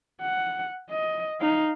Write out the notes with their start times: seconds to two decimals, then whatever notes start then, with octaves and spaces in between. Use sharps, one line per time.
0.21 F#5
0.90 D#5
1.41 D#4 F5